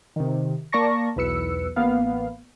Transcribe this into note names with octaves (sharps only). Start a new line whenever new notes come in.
C3 D#3
A#3 D5 A5 C#6 A#6
B1 E2 B4 E6 C#7
A1 A#3 B3 F5